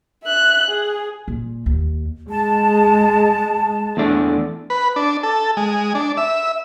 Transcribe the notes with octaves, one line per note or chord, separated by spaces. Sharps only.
E5 F#6
G#4
A#2
D#2
G#3 A5
E2 A3 D4
B4
D4
A4
G#3
D4
E5